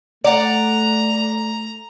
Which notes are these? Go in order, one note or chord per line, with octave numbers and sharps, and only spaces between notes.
A3 D5 F#5 A#5